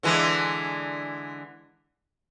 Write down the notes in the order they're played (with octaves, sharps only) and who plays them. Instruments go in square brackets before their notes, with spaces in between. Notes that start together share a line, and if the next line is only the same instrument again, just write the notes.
[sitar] D3 E3 G#3